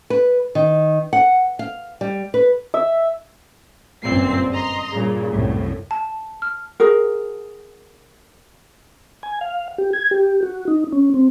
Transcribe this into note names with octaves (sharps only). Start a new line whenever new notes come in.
B4
D#3
F#5
F5
G3
B4
E5
G1 F#2 A#2 C4 C7
D#5 A#5 C6
G2 A#2 C#3
C2 F#2 A2
A5
F6
F#4 G#4 A#4
G#5
F5
G4
G#6
G4
F#4
D#4
C#4
C4